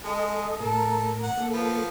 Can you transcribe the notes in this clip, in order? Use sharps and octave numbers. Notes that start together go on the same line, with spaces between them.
G#3 G#4 A4 D#5
A2 A4 A#4
F#5
A#3 A4
F3 B3